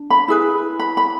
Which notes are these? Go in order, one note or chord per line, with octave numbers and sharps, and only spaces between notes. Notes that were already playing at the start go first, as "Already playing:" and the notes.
Already playing: D4
B5
E4 G#4 B4
B5
B5